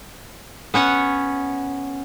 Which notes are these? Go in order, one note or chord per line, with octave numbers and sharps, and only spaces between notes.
B3 C#4 C#5 F#5